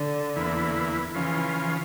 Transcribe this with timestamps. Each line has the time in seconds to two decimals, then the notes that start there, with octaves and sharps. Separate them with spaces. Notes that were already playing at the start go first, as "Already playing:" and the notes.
Already playing: D3
0.36 E2 E3 A#3 E4
1.14 C#3 E3 F3 C#4 F4